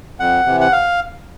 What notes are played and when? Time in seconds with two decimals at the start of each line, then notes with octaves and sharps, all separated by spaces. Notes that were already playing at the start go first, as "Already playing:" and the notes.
0.19 F2 F#5
0.46 C3 E3
0.60 F#5
0.72 F5